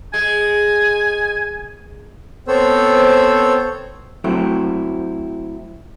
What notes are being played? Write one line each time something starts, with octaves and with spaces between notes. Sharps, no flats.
G#3 G#5
B3 C4 A4 C5 C#5 E6
F#3 A3 C4 E4